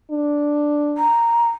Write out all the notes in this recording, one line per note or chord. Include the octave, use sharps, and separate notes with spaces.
D4
A#5